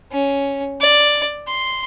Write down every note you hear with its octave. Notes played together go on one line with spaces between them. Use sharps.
C#4
D5
C6